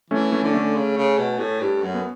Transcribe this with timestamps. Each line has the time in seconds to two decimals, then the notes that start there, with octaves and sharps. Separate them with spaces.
0.10 E3 A3 C#4
0.32 A3 C#4
0.43 D3
0.54 A3 C#4
0.75 C#3
0.97 C#3
1.18 B2
1.39 A2
1.60 G2
1.82 F#2
1.94 B3